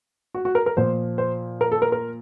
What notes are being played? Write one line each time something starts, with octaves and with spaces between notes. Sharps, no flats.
F#4
F#4
A#4
A#4
A#2 F3 C5
C5
A#4
A4
A#4
A#4